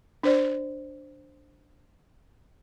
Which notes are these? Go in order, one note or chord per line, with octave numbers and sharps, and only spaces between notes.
D4 C5 D5